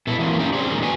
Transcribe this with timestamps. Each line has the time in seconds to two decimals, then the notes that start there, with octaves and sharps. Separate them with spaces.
0.07 B2 E4 A4
0.18 E3 F#3 A#3 C4
0.39 C#4 D#4 F4 G4 A#4
0.53 C4 C#4 G#4 C5 D5
0.71 A#2 D3 D#3 G#3
0.82 F#4 B4 G#5